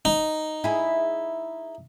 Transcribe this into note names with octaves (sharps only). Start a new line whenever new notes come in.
D#4
E4 G#4